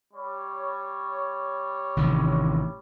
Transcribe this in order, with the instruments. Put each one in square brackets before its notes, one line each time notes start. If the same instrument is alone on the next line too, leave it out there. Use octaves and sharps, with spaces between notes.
[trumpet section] G3 C#5
[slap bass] A1 C3 D#3